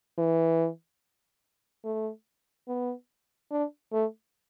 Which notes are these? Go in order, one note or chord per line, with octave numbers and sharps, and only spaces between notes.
E3
A3
B3
D4
A3